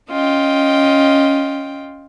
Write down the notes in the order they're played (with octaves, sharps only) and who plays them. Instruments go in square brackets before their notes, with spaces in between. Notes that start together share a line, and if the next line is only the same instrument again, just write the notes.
[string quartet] C#4 F4 D#5 G5